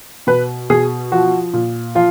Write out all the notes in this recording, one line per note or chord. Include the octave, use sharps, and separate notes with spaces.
B2 B4
B2 G#4
F3 F#4
A#2
F3 F4